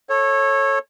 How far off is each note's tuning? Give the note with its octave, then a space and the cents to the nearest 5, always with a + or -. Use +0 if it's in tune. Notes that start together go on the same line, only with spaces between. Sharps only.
A4 +0 C#5 -20